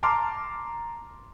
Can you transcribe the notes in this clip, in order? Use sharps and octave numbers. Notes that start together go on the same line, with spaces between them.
A5 A#5 C6 D6 F6